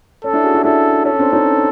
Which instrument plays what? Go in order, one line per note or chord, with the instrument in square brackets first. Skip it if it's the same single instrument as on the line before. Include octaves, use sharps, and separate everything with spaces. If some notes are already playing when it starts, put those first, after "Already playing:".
[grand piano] C#4 [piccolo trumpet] A4
[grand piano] D4 E4
F#4 G#4
E4 F#4
[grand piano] D4 E4 [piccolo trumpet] A4
[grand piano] C#4 [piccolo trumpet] A4
[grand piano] C4 D4
C#4 D#4